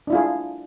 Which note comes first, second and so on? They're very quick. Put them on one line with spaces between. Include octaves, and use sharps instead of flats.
D4 E4 F4 G#4